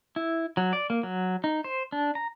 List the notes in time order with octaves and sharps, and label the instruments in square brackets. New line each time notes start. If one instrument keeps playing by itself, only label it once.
[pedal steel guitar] E4
F#3
D5
A#3
F#3
D#4
C5
D4
A#5